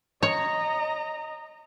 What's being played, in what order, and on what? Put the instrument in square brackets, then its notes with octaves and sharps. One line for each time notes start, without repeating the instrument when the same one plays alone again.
[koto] C#5 [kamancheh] D#5 A#5